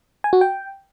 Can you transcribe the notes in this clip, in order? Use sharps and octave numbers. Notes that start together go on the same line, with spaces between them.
G#5
F#4
G5